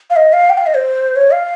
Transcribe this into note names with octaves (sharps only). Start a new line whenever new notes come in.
F5
D#5
F5
G5
F5
D#5
C5
C#5
F5